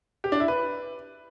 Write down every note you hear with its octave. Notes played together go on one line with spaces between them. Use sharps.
G4
D4
E4
B4